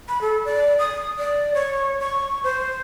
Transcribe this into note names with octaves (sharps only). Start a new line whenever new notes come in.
B5
A4
D5
D#6
D5
C#5
C#6
C5